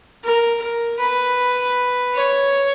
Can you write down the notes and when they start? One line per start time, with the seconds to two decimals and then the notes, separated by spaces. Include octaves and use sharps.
0.24 A#4
0.62 A#4
1.00 B4
2.15 C#5